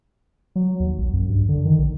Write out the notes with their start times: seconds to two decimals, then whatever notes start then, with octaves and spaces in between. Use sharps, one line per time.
0.56 F#3
0.80 D#2
0.99 A#1
1.13 F#2
1.30 G2
1.49 D3
1.65 D#3
1.79 A#1